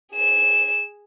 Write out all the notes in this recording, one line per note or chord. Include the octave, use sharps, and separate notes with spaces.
G#4 E7